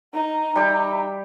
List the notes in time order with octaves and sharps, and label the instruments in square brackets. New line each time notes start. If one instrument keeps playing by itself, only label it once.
[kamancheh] D#4 [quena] A#5
[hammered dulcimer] G3 G4 [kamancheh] D#4 E5